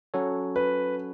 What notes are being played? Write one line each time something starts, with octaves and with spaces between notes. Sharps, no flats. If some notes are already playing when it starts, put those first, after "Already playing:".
F#3 C#4 F#4 A4 C#5
B4